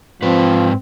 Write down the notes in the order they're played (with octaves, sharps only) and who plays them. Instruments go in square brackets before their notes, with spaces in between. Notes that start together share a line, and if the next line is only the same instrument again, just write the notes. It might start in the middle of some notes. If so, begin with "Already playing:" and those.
[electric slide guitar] G#2 B4 [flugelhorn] F3 [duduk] C4